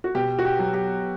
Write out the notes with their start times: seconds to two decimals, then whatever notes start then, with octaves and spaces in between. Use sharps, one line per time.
0.04 F#4
0.15 B2 G4
0.39 F#4
0.45 G4
0.59 F#3
0.74 G4